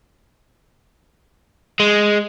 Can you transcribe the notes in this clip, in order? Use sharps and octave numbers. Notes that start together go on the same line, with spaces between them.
G#3